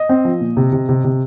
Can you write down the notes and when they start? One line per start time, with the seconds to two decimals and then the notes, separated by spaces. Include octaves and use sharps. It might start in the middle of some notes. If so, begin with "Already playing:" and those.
Already playing: D#5
0.09 C4
0.25 F3
0.41 A#2
0.57 C3
0.72 C3
0.89 C3
1.04 C3